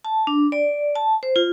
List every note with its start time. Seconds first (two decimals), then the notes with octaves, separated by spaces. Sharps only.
0.05 A5
0.27 D4
0.52 D5
0.95 A5
1.23 C5
1.36 F4